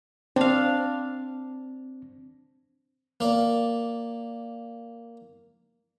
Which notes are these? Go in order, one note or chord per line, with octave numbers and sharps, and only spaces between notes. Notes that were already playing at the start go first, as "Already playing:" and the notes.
C4 D4 F5
A#3 D5